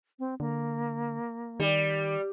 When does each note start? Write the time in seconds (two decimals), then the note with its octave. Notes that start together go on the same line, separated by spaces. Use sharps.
0.19 C4
0.40 D3 A#3
1.60 D#3 G3